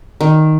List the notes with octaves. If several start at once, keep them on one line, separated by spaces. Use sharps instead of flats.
D#3